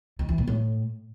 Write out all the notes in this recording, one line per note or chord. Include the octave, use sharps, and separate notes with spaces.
D#3
E3
A#2
A2